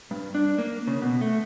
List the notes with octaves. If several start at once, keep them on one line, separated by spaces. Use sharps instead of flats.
G2
D4
A#3
C#3
B2
A3